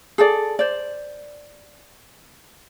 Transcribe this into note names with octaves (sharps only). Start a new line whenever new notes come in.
G#4 A4 D5
C5 D5